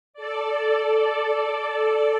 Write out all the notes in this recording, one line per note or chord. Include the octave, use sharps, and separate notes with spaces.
A4 D5